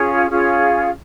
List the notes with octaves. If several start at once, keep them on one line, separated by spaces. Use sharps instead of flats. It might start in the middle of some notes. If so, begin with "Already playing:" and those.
Already playing: C#4 F4 G#4
C#4 F4 G#4